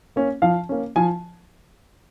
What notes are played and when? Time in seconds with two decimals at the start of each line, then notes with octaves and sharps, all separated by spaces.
0.16 A#3 C#4
0.42 F3 F5
0.69 A#3 C#4
0.96 F3 G#5